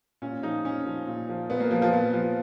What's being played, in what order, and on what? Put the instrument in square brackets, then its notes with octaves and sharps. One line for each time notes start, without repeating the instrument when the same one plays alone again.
[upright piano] A#2 C#4
F3 D#4
A#2 C#4
F3
A#2
F3
A#2 B3
A#3
F3
F3
A#2 B3
F3